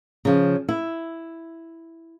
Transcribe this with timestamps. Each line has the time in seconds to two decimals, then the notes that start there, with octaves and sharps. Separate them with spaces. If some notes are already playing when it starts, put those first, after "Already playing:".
0.25 C#3 F3
0.69 E4